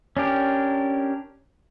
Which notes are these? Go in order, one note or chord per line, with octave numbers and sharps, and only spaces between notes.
C#4 D4 G4 A#4